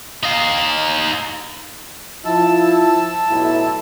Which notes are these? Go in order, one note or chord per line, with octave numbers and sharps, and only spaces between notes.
D#4 F5
F3 E4 A5 E6
B1 A2 E4